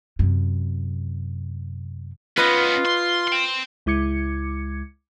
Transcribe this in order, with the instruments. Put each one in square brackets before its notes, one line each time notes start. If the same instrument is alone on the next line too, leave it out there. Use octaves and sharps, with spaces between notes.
[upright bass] F#2 C3
[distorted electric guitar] B3 C#4 [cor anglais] F4 [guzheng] B4 D#5
[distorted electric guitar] C6
G5 C6
[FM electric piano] C#2 G#3 E4 D6 G#6 C#7